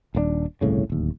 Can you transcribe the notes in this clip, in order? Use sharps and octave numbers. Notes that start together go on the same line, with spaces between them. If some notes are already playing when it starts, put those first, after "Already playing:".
D#1 A2 D4
G1 C2 A2 C#3
D1 D#2